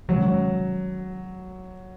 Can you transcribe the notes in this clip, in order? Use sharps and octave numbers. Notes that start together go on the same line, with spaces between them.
C3 D#3 F#3 G#3 C#4